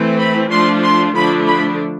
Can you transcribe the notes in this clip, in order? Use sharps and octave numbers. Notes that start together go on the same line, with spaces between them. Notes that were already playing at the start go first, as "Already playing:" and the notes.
Already playing: E3 A3 C4
B5
F3 A3 D4 F4 C6
C6
D3 F3 A3 D4 B5
B5